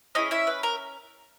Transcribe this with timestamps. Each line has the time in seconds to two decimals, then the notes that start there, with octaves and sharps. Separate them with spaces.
0.15 C#4 D#4 E4 G#4 D#5
0.31 E4 E5
0.47 B4
0.63 A#4